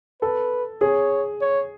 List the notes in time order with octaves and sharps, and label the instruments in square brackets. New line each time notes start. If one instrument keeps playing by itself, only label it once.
[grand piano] A4 [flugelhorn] B4
[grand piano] G#4 [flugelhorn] C#5
[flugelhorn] C#5